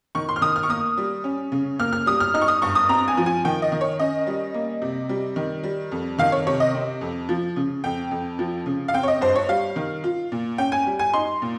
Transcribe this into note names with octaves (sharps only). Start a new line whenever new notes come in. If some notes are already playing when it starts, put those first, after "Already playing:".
D#3 C#6
C6
F6
D#3 D#6
F6
C#6
A#3 D#6
G3
C#4
C#3
A#3 F6
F6
G3 D#6
F6
D#4 F6
C#6
D#6
G2 C#6
D#6
C4 A#5
G#5
F3
G#5
D#3 G5
D#5
D#3
C#5
C#4 D#5
G3
A#3
C3
G3
D#3
G3
F2
D#3 F5
C#5
C3 C#5
D#5
C4
F2
F3
C#3
F2 G5
F2
F3
C#3
F5
C4 G5
C#5
D#5
G2 C5
C#5
G3 F5
D#3
F4
A#2
C#4 G5
G#5
G3
G#5
D#4 C6
A#2